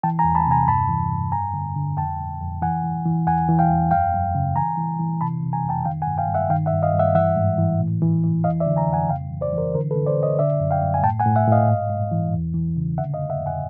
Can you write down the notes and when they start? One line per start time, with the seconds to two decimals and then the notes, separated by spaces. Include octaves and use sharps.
0.03 E3 G5 A5
0.19 G#5 A#5
0.24 E2
0.35 A5 B5
0.47 C3 G#5 A#5
0.68 G2 A5 B5
0.89 E3
1.12 G2
1.32 F2 G#5 A#5
1.54 D3
1.76 D3
1.97 F2 G5 A5
2.19 F2
2.41 F2
2.62 E3 F#5 G#5
2.84 E3
3.05 E3
3.27 E2 F#5 G#5
3.49 E3
3.59 F5 G5
3.69 E2
3.91 F#2 F5 G5
4.14 F#2
4.35 C#3
4.56 E3 G#5 A#5
4.78 E3
4.99 E3
5.21 C3 A5 B5
5.43 C3
5.53 G#5 A#5
5.64 F2
5.69 G5 A5
5.85 D#3 F5 G5
6.02 F#5 G#5
6.07 G2
6.18 F5 G5
6.29 G2
6.34 E5 F#5
6.50 D#3 F5 G5
6.66 E5 F#5
6.72 G2
6.83 D#5 F5
6.94 G2
6.99 E5 F#5
7.15 E3 E5 F#5
7.36 G#2
7.58 E3
7.80 A2
8.02 E3
8.24 E3
8.44 F2 D#5 F5
8.60 D5 E5
8.66 D3
8.76 G#5 A#5
8.87 F2
8.93 F#5 G#5
9.09 C#3 F5 G5
9.30 E3
9.41 C5 D5
9.53 E3 A#4 C5
9.74 D3 A#4 C5
9.91 A4 B4
9.96 D3
10.07 C5 D5
10.17 D3
10.23 C#5 D#5
10.39 D3 D5 E5
10.60 F#2
10.71 F5 G5
10.82 F#2
10.94 G#5
11.03 A2 G5 A5
11.20 F#5 G#5
11.26 A2
11.36 E5 F#5
11.47 A2 D#5 F5
11.68 G#2
11.89 G#2
12.12 E3
12.34 E2
12.54 E3
12.77 C#3
12.98 D3 E5 F#5
13.14 D#5 F5
13.20 F2
13.30 E5 F#5
13.41 F2
13.46 F#5 G#5